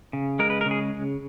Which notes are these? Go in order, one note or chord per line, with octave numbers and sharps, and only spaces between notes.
C#3
G#3 A#4
B4
A#4
C#3
G#4